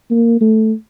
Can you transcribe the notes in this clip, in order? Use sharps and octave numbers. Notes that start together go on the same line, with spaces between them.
A#3
A3